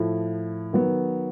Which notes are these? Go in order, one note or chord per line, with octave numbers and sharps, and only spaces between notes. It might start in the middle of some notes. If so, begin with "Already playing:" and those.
Already playing: A2 F3 A3
D#3 F#3 B3